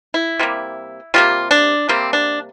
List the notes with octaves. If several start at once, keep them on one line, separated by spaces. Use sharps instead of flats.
E4
C3 G3 A#3
C3 G3 A#3 F4
D4
C3 G3 A#3 C4
D4